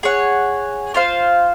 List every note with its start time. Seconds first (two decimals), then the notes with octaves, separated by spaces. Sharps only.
0.03 G#4 C#5 F#5
0.94 F4 C5 F5